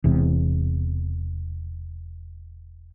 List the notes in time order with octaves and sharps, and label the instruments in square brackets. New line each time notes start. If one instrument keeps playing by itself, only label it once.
[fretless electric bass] E1 E2 C3